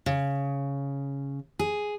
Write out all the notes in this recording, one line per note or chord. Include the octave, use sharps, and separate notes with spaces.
C#3
G#4